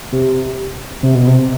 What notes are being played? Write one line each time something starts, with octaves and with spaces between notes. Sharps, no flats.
C3
C3
B2
C3